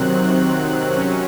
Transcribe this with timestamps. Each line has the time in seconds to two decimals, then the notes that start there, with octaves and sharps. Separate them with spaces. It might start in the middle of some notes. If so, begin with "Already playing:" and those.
Already playing: C3 D#3 F#3 C4 F#6
0.96 F#3 C#4